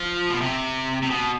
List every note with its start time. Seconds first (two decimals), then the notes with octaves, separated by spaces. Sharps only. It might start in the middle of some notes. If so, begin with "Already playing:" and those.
Already playing: F3
0.30 B2
0.41 C3
1.02 C3
1.10 B2